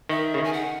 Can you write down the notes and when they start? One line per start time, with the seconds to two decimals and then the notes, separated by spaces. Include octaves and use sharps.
0.09 D#3 E5
0.34 C#3
0.38 D#3
0.44 G#5
0.53 F#5